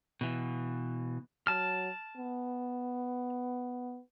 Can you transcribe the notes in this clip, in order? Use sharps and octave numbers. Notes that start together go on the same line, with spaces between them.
B2 E3
F#3 A5 F6
B3